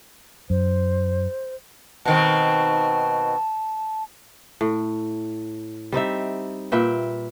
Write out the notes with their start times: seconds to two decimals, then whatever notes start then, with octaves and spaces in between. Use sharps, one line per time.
0.50 F#2 C5
2.05 B2 D#3 C4 A5
4.61 A2
5.92 G3 C4 D#4 E5
6.72 A#2 B4 E5 G5